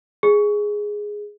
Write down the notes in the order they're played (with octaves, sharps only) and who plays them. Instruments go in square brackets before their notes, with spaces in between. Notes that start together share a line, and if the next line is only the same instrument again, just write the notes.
[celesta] G#4